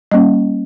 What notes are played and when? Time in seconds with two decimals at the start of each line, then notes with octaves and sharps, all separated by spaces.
0.11 G3 A#3 C#4 D#5